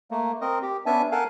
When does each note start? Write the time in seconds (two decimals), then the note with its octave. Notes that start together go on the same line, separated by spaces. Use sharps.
0.11 A3 A#3
0.41 C4 A#4 D#5
0.62 G4
0.86 B3 C#4 D4 E5 G#5 A5
1.12 A4 A#4 F5 F#5 G#5 A5